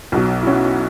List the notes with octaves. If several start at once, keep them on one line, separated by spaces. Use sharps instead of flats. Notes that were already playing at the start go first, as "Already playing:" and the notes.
B1 B2 F#3
E4
C#4 F#4